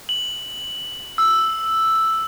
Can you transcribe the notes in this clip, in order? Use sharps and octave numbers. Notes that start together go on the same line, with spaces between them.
F#7
E6